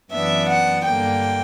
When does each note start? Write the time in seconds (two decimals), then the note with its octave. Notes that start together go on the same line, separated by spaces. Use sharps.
0.12 F#2 E3 B3 D4 E5
0.49 F#5
0.86 G2 D3 A#3 G5